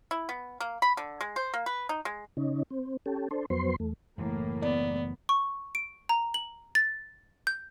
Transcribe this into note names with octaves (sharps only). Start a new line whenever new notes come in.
E4
B3
A#3
B5
D3
G#3
C5
A#3
B4
D#4
G#3
C#3 C#4 D#4
C4
C#4 G4 A4
D4 A4 C5
F2 F#3 B3 C5 C6
E2 A3
F#1 A2 E3 A#3
B3 D5
C#6
D7
A#5
F#7
A6
G6